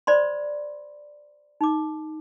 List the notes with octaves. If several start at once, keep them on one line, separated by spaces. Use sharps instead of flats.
C5 D5 B5 C6
D#4 D6